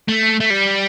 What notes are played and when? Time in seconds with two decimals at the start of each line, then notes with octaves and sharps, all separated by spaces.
0.08 A3
0.40 A3
0.50 G3